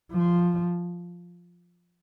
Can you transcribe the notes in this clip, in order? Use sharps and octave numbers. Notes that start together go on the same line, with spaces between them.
F3